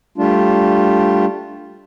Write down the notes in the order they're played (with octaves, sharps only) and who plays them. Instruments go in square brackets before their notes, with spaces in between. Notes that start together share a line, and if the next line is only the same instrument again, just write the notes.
[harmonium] G3 A3 D4 F4